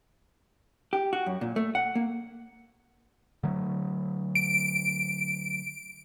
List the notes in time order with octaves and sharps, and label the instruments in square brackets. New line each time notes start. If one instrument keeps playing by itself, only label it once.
[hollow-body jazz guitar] G4
F#4
F#2
A#2
A3
F#5
A#3
[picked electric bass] D3 F#3 A3
[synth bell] D7